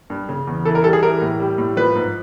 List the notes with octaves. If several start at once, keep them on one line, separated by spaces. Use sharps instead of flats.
G2
C#3
E2
E3 A4
A#4
G3 A4
G#4
E3 A#4
A2
G3
A2
F3 B4
G#2